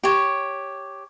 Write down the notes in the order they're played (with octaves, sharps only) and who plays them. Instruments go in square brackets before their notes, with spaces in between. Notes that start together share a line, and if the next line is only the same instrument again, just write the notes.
[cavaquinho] G4 C#5